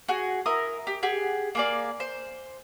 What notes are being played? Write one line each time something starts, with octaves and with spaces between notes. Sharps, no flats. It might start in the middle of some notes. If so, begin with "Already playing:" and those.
F#4 G#4 G#5
E4 A#4 D#6
G4
G4 G#4 F#5
A#3 G#4 D5
C5